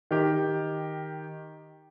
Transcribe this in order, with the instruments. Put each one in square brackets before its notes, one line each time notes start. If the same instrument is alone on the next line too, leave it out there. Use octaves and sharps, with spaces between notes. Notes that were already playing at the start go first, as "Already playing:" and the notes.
[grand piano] D#3 G4